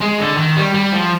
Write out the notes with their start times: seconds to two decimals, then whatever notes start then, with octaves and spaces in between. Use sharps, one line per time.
0.01 G#3
0.19 D3
0.37 D#3
0.56 G3
0.74 G3
0.92 F3